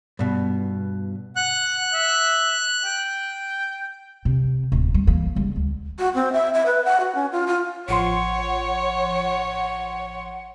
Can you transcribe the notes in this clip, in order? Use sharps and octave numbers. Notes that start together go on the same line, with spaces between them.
G2 B2
F#5 F#6
E5
G5
C3
D1
G3
E3 A#3
C#3 G3
D2
F#4
C4
E5
E5
B4
F#5
F#4
C#4
F4
F4
A1 F3 C#5 F#5 C6